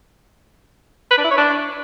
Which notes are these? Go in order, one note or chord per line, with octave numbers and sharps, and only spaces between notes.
B4
D4
E4
C#5
D4